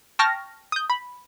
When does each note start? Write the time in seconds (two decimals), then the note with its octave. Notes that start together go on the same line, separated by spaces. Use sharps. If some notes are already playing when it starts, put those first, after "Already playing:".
0.19 G5 A5 C#6 F6 A#6
0.72 D#6 G6
0.90 B5